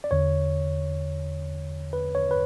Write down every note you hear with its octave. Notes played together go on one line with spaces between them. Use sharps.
D5
E2 D3 C#5
B4
C#5
B4